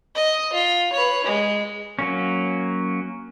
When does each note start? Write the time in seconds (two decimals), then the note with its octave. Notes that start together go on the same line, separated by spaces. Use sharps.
0.15 D#5
0.53 F4
0.93 B4 C#5
1.24 G#3
1.99 F#3 A#3 C#4